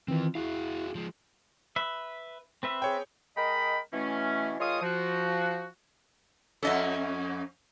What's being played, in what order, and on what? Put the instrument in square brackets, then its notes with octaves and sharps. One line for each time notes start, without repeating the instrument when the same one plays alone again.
[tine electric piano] D#3 E3 [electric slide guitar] C4 F4
[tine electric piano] E4 [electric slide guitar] F#4 G#4 F5
[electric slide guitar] F3 G#3
[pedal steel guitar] B4 E5
C4 B4 E5
[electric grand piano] G#4 C#5 G5
[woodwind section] G#3 A#4 D#5 G5 B5
B2 E3 A3 C#4
D#3 G#3 F4 C#5 F5 D#6
F3 F#4
[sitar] F2 C#4 [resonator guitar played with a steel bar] A4 D#5 E5